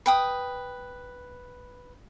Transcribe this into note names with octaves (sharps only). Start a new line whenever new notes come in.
B4 G5 D#6